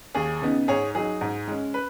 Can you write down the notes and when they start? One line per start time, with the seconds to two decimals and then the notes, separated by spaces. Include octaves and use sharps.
0.15 D#2 G#4
0.42 C#3 B3 D#4
0.68 G#2 G#4 C#5
0.95 F#3 D#4 G#4
1.21 G#2
1.47 G#3 C#4
1.74 B4